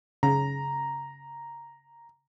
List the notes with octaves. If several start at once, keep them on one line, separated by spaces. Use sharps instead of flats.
C#3 A#5